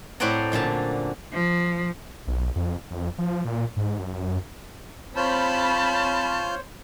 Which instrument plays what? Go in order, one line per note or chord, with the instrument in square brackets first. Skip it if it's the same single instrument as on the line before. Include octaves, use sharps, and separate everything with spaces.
[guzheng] A2 C4 C5 D5 F#5 A#5
F#2 A#2 D3 A5
[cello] F3
[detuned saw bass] B1
F2
F2
F3
A#2
G#2
F#2
[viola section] C4 B5 [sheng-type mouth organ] F4 F6 G6 [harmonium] C5 C#5 [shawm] A5